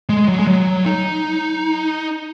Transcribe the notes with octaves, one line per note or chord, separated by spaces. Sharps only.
G#3
F#3
G#3
F#3
D#4